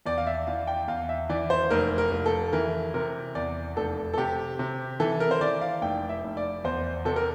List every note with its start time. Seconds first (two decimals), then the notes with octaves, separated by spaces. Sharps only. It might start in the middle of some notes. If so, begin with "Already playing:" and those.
0.06 E2 D5
0.18 F5
0.27 E5
0.47 E3 F5
0.67 G5
0.88 E2 F5
1.09 E5
1.29 E3 D5
1.50 C5
1.71 F1 A#4
1.98 A#4
2.11 F1
2.26 A4
2.53 E3 A#4
2.94 C3 A#4
3.35 E2 D5
3.77 F1 A4
4.13 A4
4.17 C3 G4
4.59 C3
5.00 E3 A4
5.20 A#4
5.31 C5
5.41 E3 D5
5.61 F5
5.82 F1 G5
6.09 E5
6.24 F1
6.37 D5
6.64 E2 C5
7.05 C3 A4
7.16 A#4